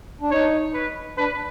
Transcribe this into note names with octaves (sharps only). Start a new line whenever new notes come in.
D4
D#4 C#5
B4
D4 B4